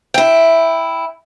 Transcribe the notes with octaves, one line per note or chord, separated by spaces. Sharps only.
E4 G5